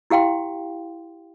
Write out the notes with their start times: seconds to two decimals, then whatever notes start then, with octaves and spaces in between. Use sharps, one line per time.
0.10 E4 G4 F5 G5 C6